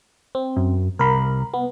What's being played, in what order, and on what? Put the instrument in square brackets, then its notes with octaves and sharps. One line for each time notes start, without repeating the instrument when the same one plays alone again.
[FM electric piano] C4
[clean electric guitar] F#2
[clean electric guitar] C2 B5 [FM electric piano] A#4
[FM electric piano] B3